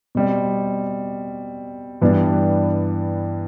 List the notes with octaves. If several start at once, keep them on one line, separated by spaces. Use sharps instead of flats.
B2 G3 C4
G2 E3 G3 B3 D4